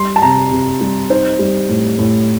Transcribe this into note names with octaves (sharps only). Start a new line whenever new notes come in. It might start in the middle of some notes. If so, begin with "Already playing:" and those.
Already playing: G3 C6
A5
C3 A#5
C3
G3
D#4 C5
G3
A2
A2